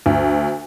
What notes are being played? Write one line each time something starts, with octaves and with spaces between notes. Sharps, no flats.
D2